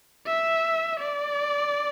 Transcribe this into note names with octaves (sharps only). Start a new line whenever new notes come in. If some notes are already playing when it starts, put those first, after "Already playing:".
E5
D5